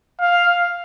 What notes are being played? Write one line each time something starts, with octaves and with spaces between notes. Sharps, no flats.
F5